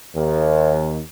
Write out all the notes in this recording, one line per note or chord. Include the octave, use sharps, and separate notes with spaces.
D#2